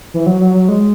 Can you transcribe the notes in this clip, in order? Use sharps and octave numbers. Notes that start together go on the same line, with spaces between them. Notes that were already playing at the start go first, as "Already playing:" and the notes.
E3
F#3
F#3
F#3
G#3